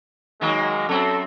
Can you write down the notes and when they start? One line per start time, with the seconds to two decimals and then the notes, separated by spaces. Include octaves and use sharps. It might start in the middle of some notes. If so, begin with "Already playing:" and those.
0.41 D#3 F#3 G#3 A#3
0.89 F#2 C4 A4